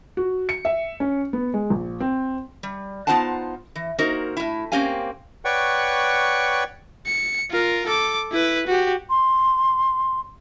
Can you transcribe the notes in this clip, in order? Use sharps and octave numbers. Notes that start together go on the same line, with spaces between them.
F#4
C#7
E5
C#4
B3
G#3
A#1
C4
G3
B3 D#4 F4 C5 F#5 A5
E3
A#3 D#4 F#4 A#4 C5
A2 E4
A#3 C4 C#4 G4 F5 G#5
B4 C#5 D5 F#5 G5 C#6
C#7
F4 A#4
A4 D6
E4 B4
F#4 G4
C6